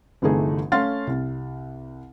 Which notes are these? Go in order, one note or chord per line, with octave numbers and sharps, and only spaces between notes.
G1 C2 E3 A3 D#4 G#4
A3 C#4 F5 C6 F6 A6
C2